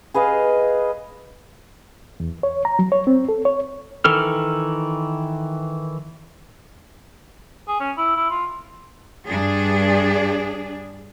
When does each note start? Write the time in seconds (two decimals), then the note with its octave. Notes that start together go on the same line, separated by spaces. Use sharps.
0.14 G#4 B4 D#5 F5
2.20 E2
2.43 C#5
2.65 A#5
2.79 F#3
2.92 C#5
3.07 C4
3.29 A4
3.45 C#5
4.04 D#3 E3 A4 F6
7.68 G#4
7.80 C#4
7.98 E4
8.17 E4
8.30 F4
9.27 G2 D4 G#4